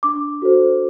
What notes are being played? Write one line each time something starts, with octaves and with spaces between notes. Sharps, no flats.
D4 D6
F#4 A4 C5